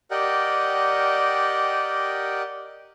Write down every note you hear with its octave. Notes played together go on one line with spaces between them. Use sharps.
G4 A#4 D5 D#5 F#5 G5